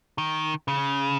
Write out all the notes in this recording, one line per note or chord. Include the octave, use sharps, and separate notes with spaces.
D#3
C#3